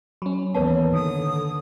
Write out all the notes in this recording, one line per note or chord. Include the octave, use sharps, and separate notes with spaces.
F#3 C#4 B5
D#2 E3 B3 B4 C#5 A5
D3 D#3 D#6